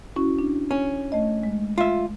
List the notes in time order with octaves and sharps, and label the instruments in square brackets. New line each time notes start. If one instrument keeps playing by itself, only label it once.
[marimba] C#4 E4 F#4
D4
[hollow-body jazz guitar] C#4
[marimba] A3 D#5
G#3
[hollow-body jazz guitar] F4 E5